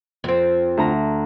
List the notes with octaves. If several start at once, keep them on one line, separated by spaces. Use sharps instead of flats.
F2 C4
D2 A#5